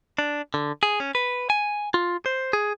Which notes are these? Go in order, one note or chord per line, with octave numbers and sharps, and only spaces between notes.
D4
D3
G#4
C#4
B4
G#5
F4
C5
G#4